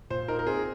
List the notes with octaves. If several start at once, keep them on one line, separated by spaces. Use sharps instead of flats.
A#2 C5
D#4 A#4
A#4
C4 G#4